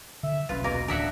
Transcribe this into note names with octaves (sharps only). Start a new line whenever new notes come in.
D3 E5
D#1 B1 C#4 F4 B4
B2 A#3 A#4
D1 D4 A#4 E5 F#5